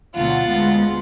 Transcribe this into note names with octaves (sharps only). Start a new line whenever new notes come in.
D2 B2 F#3 F4 F#5 A6
D2 G#3 B3